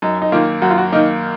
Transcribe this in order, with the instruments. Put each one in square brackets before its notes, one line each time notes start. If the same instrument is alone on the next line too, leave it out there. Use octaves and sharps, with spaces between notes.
[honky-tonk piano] F#2 [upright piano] D#4
[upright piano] D#4
[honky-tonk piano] D#3 A#3 [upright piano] F4
[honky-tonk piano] F#2 [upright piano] F#4
[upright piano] F4
F#4
[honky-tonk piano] D#3 A#3 [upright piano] D#4